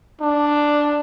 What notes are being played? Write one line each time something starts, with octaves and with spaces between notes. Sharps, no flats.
D4